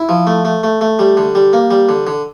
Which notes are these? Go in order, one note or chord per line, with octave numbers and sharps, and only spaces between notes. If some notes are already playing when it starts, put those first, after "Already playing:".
Already playing: E4
F3
A3
A3
A3
A3
G3
D3
G3
A#3
G3
D3
D3